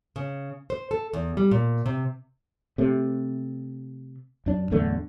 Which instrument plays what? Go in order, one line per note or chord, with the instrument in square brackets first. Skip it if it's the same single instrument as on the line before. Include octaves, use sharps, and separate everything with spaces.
[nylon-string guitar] C#3
C5
A4
E2
G3
A#2
C3
[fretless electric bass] C3 A3
F#2 D4
D1 E2 D3 A3